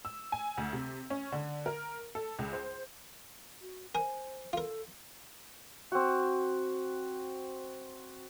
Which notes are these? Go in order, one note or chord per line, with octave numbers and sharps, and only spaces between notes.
E6
G#5
D2
C3
C#4
D3
A#4
A4
C#2
C5
F#4
A#4 C5 G#5
F4 A4 A#4
C4 F#4